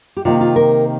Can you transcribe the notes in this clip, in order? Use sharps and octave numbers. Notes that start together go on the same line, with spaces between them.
G4
C3 D#3 A#3 F4
F4
A#4